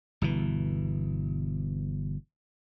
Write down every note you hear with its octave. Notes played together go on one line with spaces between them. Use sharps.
G1 B2 E3